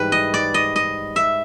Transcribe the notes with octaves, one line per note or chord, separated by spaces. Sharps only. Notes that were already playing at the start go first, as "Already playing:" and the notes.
Already playing: G#2 E3 G3 B4
D#5
D5
D#5
D#5
E5